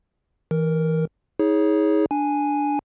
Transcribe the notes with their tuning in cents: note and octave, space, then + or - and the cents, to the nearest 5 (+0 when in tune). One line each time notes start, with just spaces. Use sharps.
E3 -20 A#4 +0
D#4 +40 G#4 +0 C#5 +0
D4 +0 G#5 +0